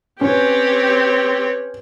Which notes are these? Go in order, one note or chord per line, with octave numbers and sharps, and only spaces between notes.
C4 C#4 G4 B4 C#5